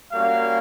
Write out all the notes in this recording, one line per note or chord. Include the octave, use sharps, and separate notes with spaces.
G3 A#3 C#4 F#4 F5